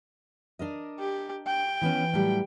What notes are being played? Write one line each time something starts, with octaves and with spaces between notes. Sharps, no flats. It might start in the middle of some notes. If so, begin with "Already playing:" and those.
D4 A#4 D#5
G4
G5
E3 B3 C#4
A2 F#3 G3